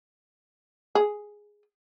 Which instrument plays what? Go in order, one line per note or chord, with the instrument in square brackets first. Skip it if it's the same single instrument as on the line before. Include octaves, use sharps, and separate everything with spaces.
[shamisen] G#4